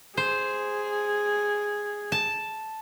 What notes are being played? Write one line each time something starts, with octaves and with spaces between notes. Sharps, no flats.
G#4 C5
A5